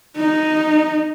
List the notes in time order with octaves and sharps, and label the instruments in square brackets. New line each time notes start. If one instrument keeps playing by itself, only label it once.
[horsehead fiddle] D#4